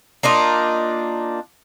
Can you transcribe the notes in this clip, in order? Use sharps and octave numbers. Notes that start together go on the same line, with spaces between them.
A#3 D4 D#4 F4